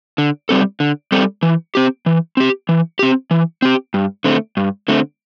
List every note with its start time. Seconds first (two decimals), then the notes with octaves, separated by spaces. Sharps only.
0.18 D3
0.49 G3 C4 A4
0.80 D3
1.12 G3 C4 A4
1.43 E3
1.75 C4 G4
2.06 E3
2.37 C4 G4
2.69 E3
2.99 C4 G4
3.31 E3
3.62 C4 G4
3.94 G2
4.24 D3 A3 C4
4.57 G2
4.88 D3 A3 C4